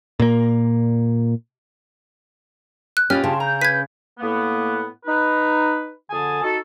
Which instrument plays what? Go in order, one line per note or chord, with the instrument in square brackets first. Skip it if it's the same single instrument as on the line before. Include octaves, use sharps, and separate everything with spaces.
[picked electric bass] A#2 A#3
[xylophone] F#6
[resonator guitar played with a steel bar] B2 F4 G4 [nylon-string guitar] C#4 [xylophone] F6
[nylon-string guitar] C#3 [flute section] G5 A5 C6
[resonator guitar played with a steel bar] A#5 [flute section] G6
[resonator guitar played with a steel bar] B4 [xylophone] G#6 B6
[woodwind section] A2 A#3 B3
D#4 B4
F2 D3 G#4 G#5 A5
D#4 F#4 A4